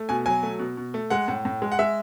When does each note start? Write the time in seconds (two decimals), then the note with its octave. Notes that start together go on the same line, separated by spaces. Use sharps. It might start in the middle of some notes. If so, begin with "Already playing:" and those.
Already playing: A3
0.09 B2 G#5
0.26 F#3 G#5
0.43 A3
0.59 B2
0.77 B2
0.94 A3
1.10 G#3 F#5
1.28 A2
1.45 A2
1.62 G#3
1.72 F#5
1.79 G#3 E5